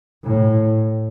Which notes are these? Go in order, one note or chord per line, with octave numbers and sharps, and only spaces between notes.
A2